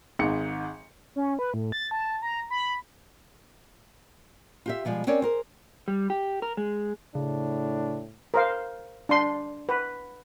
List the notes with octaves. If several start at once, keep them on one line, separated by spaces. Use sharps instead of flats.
G#1 G#2 C#7
C#4
B4
A2
A6
A5
A#5
B5
F4 G4 E5
B2 F3 G3 G#3
C4 C#4 A#4 C#5 D5
G#4 A#4 C5
G3
G4
A#4
G#3
A2 C#3 D4
A#4 C5 F5
D4 C6
B4